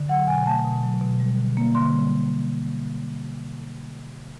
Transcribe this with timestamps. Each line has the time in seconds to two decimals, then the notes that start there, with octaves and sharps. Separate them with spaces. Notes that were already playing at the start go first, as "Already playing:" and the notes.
Already playing: D3
0.08 F#3 F#5
0.27 B2 G#5
0.46 A3 A5
0.65 B2
0.83 F#3
1.01 B2
1.20 G3
1.38 D3
1.57 A#3
1.75 D3 C6
1.93 G3